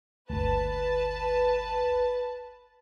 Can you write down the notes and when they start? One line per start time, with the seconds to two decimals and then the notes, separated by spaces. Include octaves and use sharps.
0.30 G1 D2 B4 A5